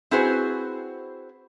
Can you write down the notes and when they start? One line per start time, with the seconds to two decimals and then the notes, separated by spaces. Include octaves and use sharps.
0.11 C4 E4 F#4 G#4 B4 C5